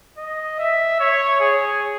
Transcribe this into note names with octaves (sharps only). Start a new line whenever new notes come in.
D#5
E5
C#5
G#4